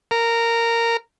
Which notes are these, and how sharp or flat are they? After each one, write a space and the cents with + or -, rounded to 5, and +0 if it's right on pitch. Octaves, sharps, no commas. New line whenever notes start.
A#4 -10